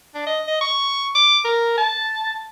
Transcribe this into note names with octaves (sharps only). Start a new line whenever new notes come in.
D4
D#5
D#5
C#6
D6
A#4
A5